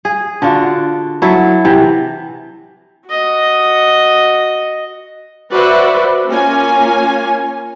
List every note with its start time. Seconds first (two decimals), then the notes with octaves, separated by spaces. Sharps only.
0.05 G#4
0.42 D3 D4 F4 F#4
1.22 F#3 E4 A4
1.65 C3 E3
3.08 F#4 D#5
5.51 F#4 B4 C5 D5 E5
6.27 A#3 C#4 F4 G#5